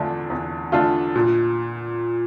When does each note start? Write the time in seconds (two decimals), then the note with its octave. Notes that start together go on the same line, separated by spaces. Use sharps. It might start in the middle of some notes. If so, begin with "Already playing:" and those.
Already playing: E2 D3 A3 D4 F4
0.30 E2
0.72 D3 A3 D4 F4
1.16 A#2